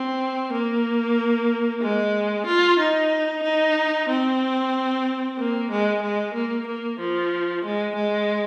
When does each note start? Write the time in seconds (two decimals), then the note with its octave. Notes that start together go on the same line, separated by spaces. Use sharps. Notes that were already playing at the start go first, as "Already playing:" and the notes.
Already playing: C4
0.53 A#3
1.82 G#3
2.46 F4
2.79 D#4
3.43 D#4
4.09 C4
5.39 A#3
5.71 G#3
6.02 G#3
6.34 A#3
6.67 A#3
7.00 F3
7.65 G#3
7.96 G#3